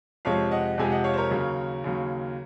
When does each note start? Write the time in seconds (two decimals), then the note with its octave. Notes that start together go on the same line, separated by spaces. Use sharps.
0.25 F2 C3 F3 G#3 C#5 F5
0.51 D#5 F#5
0.78 F2 C3 F3 G#3 G#5
0.91 D#5 F#5
1.04 C#5 F5
1.13 C5
1.17 A#4 C#5
1.31 D#2 C#3 F#3
1.84 D#2 C#3 F#3